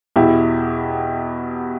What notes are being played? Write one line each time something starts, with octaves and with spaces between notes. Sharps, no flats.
E2 B2 E4 G4